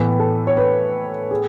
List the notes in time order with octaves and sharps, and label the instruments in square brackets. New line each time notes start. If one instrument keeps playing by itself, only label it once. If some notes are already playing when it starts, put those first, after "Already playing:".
Already playing: [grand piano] A2 E3 B3 [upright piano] B4
[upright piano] A4
C#5
B4
G#4